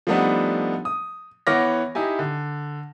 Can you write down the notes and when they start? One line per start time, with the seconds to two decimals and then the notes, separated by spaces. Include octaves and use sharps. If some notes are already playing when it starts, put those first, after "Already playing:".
0.07 F3 G3 A3 B3 D4 D#4
0.85 D#6
1.47 E3 B3 C#5 D6 F6 A#6
1.95 D#4 E4 G4 G#5
2.19 D3